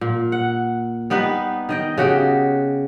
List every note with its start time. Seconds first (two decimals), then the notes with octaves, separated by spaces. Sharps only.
0.01 A#2
0.32 F#5
1.10 G3 B3 D#4 B4
1.69 D#3 D#5 G5
1.98 C#3 F#4 G4 G5